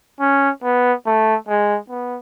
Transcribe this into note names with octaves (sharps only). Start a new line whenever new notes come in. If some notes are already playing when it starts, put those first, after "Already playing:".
C#4
B3
A3
G#3
B3